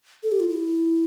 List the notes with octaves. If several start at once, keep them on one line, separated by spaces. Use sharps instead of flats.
A4
G4
F4
E4